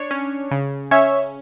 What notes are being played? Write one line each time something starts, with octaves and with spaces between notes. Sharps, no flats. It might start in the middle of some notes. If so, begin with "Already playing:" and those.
Already playing: D4 C#5
C#4
C#3
C#4 C#5 E5